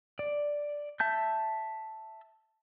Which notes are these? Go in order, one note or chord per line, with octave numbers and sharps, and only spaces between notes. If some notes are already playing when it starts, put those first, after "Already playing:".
D5
E5 A5 G6